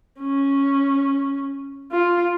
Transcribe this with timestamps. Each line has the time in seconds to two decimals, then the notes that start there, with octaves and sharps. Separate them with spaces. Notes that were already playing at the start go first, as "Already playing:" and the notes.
0.21 C#4
1.92 F4